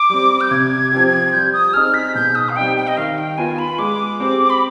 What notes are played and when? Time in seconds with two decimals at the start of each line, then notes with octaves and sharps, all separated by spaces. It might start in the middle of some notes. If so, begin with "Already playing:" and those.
Already playing: D6
0.09 G3 C4
0.41 G6
0.51 C3 G#6
0.92 F3 C4 G4
1.33 G3 G6
1.53 D#6
1.73 C4 D#4 G#4 F6
1.94 B6
2.15 B2 G6
2.35 D#6
2.49 F5
2.56 G3 C4 D#4 G5
2.77 G5
2.87 D#5
2.97 D#3 F5
3.18 G5
3.38 B3 F4 G#5
3.59 B5
3.78 G#3 D6
4.20 C4 G4
4.50 B5